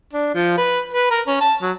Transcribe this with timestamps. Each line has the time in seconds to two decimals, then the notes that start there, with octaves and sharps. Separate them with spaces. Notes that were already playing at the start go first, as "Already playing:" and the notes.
0.13 D4
0.35 F3
0.57 B4
0.93 B4
1.11 A#4
1.28 C#4
1.41 A5
1.62 F#3